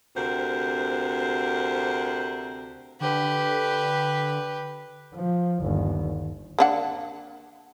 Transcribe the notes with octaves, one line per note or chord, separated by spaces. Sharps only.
D2 C3 A#4 C5 F#5
D3 G4 B4
F3
G1 D#2
A#3 D4 F#5